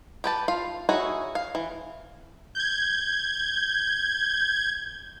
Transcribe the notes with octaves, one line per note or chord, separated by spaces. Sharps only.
G4 B4 A5
F4 F5
D#4 E4 F#4 G#4 C#5
F5
E3
G6 G#6